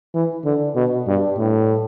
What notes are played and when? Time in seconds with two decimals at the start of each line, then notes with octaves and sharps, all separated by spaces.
0.14 E3
0.45 D3
0.76 B2
1.08 G2
1.38 A2